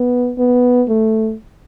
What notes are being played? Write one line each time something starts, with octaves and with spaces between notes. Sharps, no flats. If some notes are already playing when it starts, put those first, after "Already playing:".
Already playing: B3
B3
A3